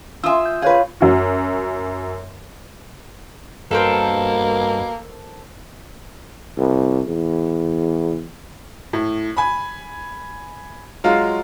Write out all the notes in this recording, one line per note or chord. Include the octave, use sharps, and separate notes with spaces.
F4 E5 G#5 D#6 E6
G6
F4 G#4 B4 C#5 F5
F#2 F#4
G2 B2 A#3 A4 A#4 C5
C2
E2
A2
G#5 B5
F#3 G#3 F4 F5